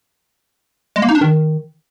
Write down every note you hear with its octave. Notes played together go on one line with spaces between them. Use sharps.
G#3
A#3
D#4
D4
D#3